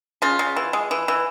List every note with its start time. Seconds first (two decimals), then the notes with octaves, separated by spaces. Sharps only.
0.22 C#3 F4
0.39 C#3
0.56 E3
0.73 G#3
0.91 E3
1.08 E3